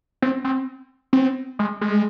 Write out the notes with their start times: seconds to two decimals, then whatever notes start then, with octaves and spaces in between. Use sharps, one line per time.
0.22 C4
0.44 C4
1.13 C4
1.59 G#3
1.81 G#3